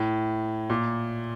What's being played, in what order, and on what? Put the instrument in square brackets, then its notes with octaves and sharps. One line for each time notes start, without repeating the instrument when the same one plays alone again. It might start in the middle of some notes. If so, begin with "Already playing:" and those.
Already playing: [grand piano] A2
A#2